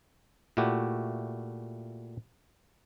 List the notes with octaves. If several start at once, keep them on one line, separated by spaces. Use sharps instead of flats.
A#2 A3 E4 F#4 G4